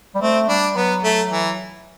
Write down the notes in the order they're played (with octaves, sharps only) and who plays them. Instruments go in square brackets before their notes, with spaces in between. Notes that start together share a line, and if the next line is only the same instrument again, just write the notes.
[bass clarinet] G3
[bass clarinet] A3 [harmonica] C4
[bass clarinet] G3 [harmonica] D4
[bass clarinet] F#3 [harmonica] B3
[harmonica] A3
E3